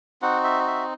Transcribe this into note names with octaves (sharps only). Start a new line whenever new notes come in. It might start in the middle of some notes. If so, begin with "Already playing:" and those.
C4 D#4 F#4 F#5
E5
E5